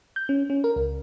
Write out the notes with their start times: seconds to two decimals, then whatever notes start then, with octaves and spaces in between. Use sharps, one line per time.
0.16 G6
0.29 C#4
0.50 C#4
0.64 A#4
0.76 C#2